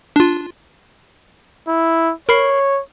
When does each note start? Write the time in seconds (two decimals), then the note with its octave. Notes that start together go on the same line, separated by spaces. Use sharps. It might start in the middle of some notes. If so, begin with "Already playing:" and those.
0.16 D4 F4
1.68 E4
2.29 A#4 C#5 B5 C7